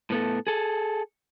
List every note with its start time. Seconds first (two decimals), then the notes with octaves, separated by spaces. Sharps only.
0.10 A2 B3 A4
0.47 G#4 A4